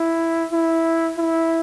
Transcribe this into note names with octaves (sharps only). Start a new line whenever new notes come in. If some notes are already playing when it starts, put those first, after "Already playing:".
Already playing: E4
E4
E4